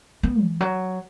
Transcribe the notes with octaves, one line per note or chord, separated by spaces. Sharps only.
B3
E3
F#3